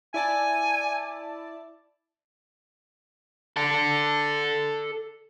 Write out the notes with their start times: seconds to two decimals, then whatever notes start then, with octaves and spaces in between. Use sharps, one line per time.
0.14 E4 D5 G#5 A5
3.57 A4 D5